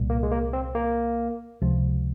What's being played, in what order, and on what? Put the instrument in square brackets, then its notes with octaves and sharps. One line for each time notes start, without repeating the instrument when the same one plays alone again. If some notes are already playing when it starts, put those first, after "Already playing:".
Already playing: [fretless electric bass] C2 A#2 G3
[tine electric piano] A#3
G#3
A#3
C4
A#3
[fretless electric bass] C#2 C3 F3